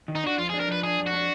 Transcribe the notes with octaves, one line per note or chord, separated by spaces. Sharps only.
D#3
D#4
D4 F#4
F2 F4
G#4
D4
A#4
F3 B4
D4 G#4
F2
F#4
D4